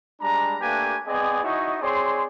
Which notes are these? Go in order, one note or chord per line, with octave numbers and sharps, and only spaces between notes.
G3 G#3 D4 A#5
A3 A#3 D4 G4 B4 G#5
B3 C4 G#4 D5 D#5 G#5
D#4 E4 F#4 C#5 D#5
C4 G#4 C#5 D5 C6